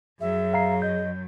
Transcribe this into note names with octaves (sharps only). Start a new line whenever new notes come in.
F#2 F#3 G#4 E5
F5 A#5 C7
D#5 G6